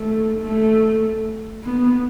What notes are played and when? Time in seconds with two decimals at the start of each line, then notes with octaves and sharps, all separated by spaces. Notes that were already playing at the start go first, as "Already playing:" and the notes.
Already playing: A3
0.42 A3
1.64 B3